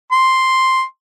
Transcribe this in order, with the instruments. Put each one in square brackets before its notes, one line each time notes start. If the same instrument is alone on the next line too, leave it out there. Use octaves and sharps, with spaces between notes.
[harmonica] C6